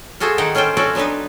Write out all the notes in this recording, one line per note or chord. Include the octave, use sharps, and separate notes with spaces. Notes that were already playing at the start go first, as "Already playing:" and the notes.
F4 F#4 G#4 A4 C5 E5
D#3 D#4 F#5 G5
C#4 F4 A4 C5 G5
C4 C#4 F#4 A4 D5 E5
F#3 B3 D4 D#4 B4